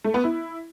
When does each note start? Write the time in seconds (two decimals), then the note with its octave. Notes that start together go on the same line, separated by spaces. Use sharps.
0.04 A3
0.14 B3
0.24 E4